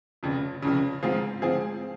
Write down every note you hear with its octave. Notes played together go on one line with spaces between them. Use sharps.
F1 F2 C#3
F1 F2 C#3
G#2 F3 C4 F4 G#4
G#2 F3 C4 F4 G#4